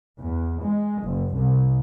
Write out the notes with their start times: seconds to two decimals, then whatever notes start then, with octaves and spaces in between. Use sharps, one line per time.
0.20 E2
0.63 G#3
1.03 F#1
1.36 C2